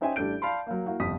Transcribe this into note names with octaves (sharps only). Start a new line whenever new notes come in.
C#4 D#4 C5 E5 G5 G#5
A1 G3 D4 A4 G6 D7
D5 F5 A5 B5 C6
F#3 A#3
A#3 E4 F#4
G1 F2 C3 D#6 B6